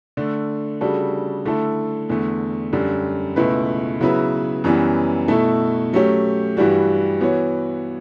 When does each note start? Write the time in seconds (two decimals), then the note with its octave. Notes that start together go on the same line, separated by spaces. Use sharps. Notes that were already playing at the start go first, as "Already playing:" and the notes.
0.17 D3 A3 D4
0.81 C#3 G3 D4 F#4 A4
1.45 D3 A3 E4 A4
2.09 E2 D3 A3
2.73 F#2 D3 G3
3.36 C#2 B2 A3 E4 B4
4.01 C#3 F#3 B3 E4 B4
4.64 F#2 E3 G3 B3
5.28 B2 A3 E4 A4
5.93 F#3 A3 C#4 G4
6.57 G2 E3 G3 D4 F#4
7.20 E3 B3 F#4 C#5